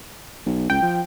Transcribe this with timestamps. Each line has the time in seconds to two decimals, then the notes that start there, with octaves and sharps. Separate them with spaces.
0.46 B1
0.70 C#2 G5
0.82 F3